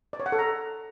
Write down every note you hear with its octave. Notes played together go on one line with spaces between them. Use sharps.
D5
C#5
F#5
A4
A#5